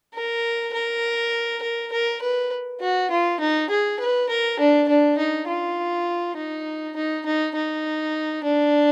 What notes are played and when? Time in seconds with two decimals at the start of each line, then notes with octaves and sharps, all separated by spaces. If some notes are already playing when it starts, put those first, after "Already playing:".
0.14 A#4
0.74 A#4
1.63 A#4
1.92 A#4
2.22 B4
2.81 F#4
3.11 F4
3.40 D#4
3.70 G#4
4.00 B4
4.29 A#4
4.59 D4
4.89 D4
5.18 D#4
5.48 F4
6.37 D#4
6.96 D#4
7.26 D#4
7.55 D#4
8.44 D4